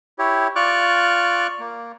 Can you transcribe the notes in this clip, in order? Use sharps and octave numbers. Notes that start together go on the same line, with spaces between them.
E4 G4 C#5
F4 D5 C#6 D6 F6 F#6
A#3